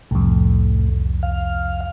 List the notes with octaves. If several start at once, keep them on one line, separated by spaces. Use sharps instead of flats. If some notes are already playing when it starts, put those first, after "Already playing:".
C2 F2 A2
F5